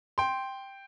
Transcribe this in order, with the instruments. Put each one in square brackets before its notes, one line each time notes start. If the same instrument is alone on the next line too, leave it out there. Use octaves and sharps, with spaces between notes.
[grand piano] G5 C6